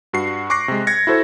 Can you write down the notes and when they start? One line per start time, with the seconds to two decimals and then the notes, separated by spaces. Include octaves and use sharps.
0.13 G2 F#4 C7
0.50 C#6 D6 F#6 A#6 C7
0.68 C3 G#3
0.87 G#6 A#6 C#7
1.07 E4 F#4 A4 C5